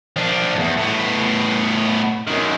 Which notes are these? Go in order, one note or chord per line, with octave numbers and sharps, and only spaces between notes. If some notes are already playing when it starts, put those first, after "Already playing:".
F3 D4
E2 G#2
A2 B3
F#2 D#3